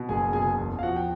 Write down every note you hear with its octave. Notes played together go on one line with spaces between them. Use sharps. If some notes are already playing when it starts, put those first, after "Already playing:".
Already playing: B2
F#1 G#4 G#5
B2 G#4 G#5
E2
F5
F3 F#4 F#5
G5